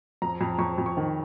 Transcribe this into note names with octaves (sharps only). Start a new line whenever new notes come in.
F2 A#5
F2
F2 C#6
F2
C#6
D#3